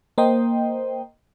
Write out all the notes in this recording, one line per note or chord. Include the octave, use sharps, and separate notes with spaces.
A#3 C5 D#5 G5